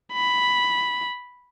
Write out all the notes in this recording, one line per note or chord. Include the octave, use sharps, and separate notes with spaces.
B5